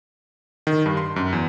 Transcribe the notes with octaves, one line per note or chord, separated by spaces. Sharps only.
D#3
G2
C6
F#2
E2